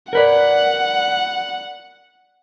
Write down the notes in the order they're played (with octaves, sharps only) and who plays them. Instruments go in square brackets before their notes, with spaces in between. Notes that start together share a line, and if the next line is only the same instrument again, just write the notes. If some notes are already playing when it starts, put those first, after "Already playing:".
[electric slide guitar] A#4 B4 D5 [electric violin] F#5